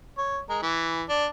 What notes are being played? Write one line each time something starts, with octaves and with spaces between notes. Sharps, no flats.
C#5
G#3 A#4
E3
D4